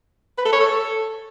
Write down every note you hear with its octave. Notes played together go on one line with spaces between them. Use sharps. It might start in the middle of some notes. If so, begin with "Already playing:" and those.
B4
A4
C#5
A4